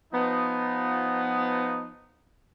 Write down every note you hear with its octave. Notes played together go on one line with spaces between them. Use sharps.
F3 B3 D#4